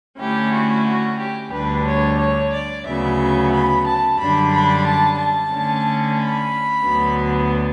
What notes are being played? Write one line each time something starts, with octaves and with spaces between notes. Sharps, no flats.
D3 A3 C#4 E4 G4
F#4
F#4
G4
D2 D3 G3 D4 B4
C#5
C#5
D5
D2 C#3 F#3 B3 E5
B5
A5
F#2 D3 G3 D4 B5
B5
A5
A5
D3 A3 C#4
B5
D2 D3 F#3 B3